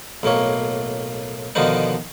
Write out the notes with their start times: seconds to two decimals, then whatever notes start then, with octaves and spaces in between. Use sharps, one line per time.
0.23 B1 A2 A#3 C#5
1.55 B2 D3 D#3 F3 B3 D#4